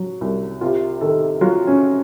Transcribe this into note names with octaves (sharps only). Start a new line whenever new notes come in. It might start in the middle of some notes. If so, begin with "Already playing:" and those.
Already playing: F#3
C2
C3 F4
D#3 A4
F#3 F4
C#4